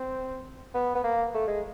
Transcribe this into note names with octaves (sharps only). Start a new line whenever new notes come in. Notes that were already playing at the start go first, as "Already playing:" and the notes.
Already playing: C4
B3
B3
A#3
A3
G#3